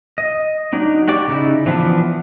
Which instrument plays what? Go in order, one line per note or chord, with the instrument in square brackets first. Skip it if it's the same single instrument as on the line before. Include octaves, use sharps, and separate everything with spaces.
[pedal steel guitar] D#5
F#3 D4 D#4
F#4 G4 D5 D6
C#3 D#4 E4
E3 F3 B3 D4